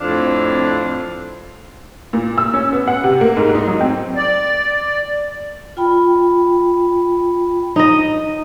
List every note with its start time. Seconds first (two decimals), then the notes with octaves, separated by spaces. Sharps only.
0.01 F2 A2 C4 D4 C5 F5
2.13 A#2
2.38 E6
2.54 C#4
2.73 B3
2.88 F#5
3.04 C3
3.21 A#3
3.37 G#2
3.55 D#4
3.67 F#3
3.81 C4
4.16 D5
5.77 F4 G5 B5
7.76 D#4 D#5